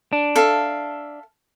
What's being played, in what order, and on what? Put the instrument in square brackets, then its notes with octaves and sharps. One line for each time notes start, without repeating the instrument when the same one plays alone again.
[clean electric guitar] D4
[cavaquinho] A4 E5 F5